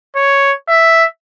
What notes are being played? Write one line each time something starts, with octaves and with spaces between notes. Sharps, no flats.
C#5
E5